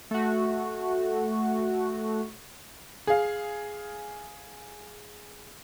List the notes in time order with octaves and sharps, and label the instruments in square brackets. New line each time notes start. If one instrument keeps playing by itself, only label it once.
[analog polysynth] A3 F#4
[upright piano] G#4 F5